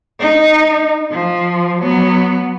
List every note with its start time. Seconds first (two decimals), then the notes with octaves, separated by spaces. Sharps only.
0.19 D#4
1.11 F3
1.81 F#3 B3